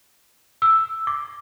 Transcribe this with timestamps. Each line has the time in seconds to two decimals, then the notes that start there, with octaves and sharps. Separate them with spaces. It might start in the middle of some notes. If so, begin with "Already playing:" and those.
0.62 E6
1.07 D6